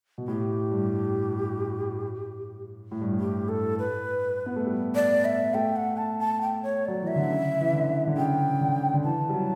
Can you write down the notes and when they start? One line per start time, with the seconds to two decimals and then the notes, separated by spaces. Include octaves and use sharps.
0.18 B2
0.28 A2 G4
0.72 G2
2.91 A2
3.01 G2
3.13 A2
3.20 G4
3.49 A4
3.79 B4
4.46 B3
4.56 A3
4.66 G3
4.95 D5
5.25 E5
5.54 A3 G5
5.76 F#5
5.97 A5
6.19 A5
6.41 G5
6.63 C#5
6.85 F#3 D5
7.02 E3 E5
7.16 D3
7.29 C#3
7.61 E3
7.73 D3
8.07 D3
8.17 C#3 G5
8.61 D3
8.94 D3
9.04 E3 A5
9.29 G3
9.34 F#3